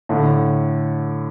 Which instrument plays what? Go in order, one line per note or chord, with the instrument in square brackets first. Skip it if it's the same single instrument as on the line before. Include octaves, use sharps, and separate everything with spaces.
[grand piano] A2 D3